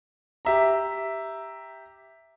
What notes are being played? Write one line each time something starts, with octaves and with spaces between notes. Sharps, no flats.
G4 E5 A#5